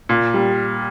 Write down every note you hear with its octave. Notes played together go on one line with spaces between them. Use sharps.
A#2
G3